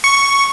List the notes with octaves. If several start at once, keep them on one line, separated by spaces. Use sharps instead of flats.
C#6